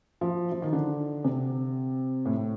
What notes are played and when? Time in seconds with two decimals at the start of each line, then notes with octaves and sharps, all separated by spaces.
0.21 F3
0.52 F3
0.62 D#3
0.73 D3
1.24 C3
2.25 A2